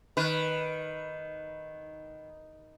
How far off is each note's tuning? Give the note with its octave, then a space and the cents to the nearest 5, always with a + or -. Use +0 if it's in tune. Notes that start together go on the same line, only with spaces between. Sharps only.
D#3 +0 B4 +0